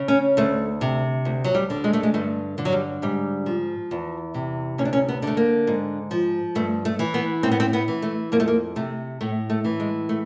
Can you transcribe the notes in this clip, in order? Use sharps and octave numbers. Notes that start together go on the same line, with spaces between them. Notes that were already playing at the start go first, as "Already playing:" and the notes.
Already playing: C#3
C#4
D2 A3
C3
D2
F#3
G3
D3
G#3
A3
G#3
G2 A3
D3
F#3
G3
G#2 G3
F3
E2
C3
D2 C#4
D4
C#4
B3
D3 A3
A#3
G#2
F3
G2 A3
A3
E3
B3
A2 C4
B3
C4
B3
E3
A3
F2 A#3
A3
A#3
C3 A3
A2 A3
A3
E3
G#3
A3